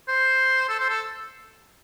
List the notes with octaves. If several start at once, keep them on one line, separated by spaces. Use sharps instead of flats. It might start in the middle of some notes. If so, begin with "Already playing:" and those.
C5
A4
C5
A4